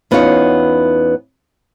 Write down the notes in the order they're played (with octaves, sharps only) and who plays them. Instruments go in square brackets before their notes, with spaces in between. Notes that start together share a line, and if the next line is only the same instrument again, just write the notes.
[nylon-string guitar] E2 B3 C#4 D#4 F4 C#5